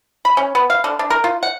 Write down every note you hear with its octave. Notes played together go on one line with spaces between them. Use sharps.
B5
C#4
B3
F5
D3
D4
A#4
F4
F#5